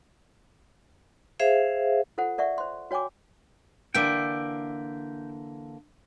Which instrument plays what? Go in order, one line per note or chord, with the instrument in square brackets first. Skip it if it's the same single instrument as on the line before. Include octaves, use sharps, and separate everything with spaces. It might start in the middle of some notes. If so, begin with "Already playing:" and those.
[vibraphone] G#4 C5 E5 F5
[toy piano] F4 A4 C5 F#5
A#4 D5 E5 F#5 C#6
C5 C6
F#4 C#5 G5 G#5 D6
[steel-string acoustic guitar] D3 E3 A#3 [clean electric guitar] D5 E5 G5